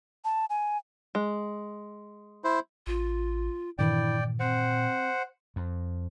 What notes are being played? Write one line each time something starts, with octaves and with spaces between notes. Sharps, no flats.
A5
G#5
G#3
E4 C5
A1 F4
G2 A#2 D#3 E3 E4 D5 G5
C4 C5 F#5
F2